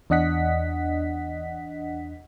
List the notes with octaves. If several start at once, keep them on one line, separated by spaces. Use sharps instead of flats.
E2 D4 D#5 F#5 B6